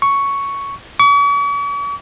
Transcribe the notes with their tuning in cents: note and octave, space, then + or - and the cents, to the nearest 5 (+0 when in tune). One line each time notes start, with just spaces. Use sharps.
C#6 +5
C#6 +45